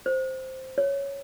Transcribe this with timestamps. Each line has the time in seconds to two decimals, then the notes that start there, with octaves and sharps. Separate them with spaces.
0.06 C5
0.78 C#5